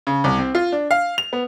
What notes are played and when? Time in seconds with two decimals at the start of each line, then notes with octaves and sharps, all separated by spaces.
0.07 C#3
0.24 C2
0.39 C4
0.55 F4
0.72 D4
0.91 F5
1.18 F7
1.33 B3